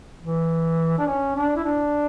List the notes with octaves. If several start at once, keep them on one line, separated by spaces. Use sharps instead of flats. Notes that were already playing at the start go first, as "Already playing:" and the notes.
E3
D4
C#4
D4
E4
D4